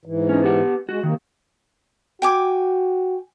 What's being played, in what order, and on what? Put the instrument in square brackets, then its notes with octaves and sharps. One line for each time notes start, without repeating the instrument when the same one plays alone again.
[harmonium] G#2 E3
[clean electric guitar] C#4 D#4
B3 G4 F#5
[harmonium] G#3 [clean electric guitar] F#4
[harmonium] C3 A#3 [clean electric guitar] D#3
[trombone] F#4 [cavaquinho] G5 G#5 D6